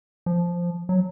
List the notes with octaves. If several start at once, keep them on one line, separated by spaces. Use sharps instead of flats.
F3
F#3